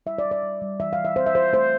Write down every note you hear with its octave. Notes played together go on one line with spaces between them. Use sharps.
G3 E5
D5
G3
D5
G3
G3
E3 E5
F5
E3
E5
C4 C5
E5
F4 C5
A3 C5